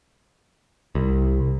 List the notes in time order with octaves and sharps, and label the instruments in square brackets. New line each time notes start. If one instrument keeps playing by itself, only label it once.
[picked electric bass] C2